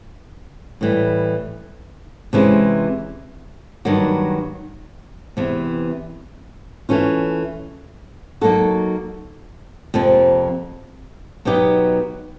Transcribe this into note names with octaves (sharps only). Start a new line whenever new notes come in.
A2 E3 G3
C3 E3 G#3 C#4 E4
G2 D#3 F#3 A#3
E2 C3 E3
E3 A3 C#4 F4
F#3 A#3 D#4 F#4 A4
F2 C3 F3 A#3
B2 F#3 B3 D#4 G4